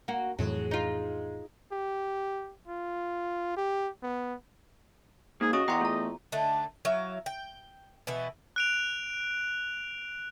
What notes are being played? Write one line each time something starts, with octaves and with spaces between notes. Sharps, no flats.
A#3 F#4
F2 A2 E3 F#3 G#3
D#4 F4
G4
F4
G4
B3
G#2 A#3 G#4
C#3 F#4 G#4 D#5 C#6 D#6
E2 E3 F#5 G5 A#5 C6 D6
A3 F4 A#5
D3 A3 D4 D#4
F#3 E4 F5
G5
B2 E3 B3 E4
F#6 D7 F7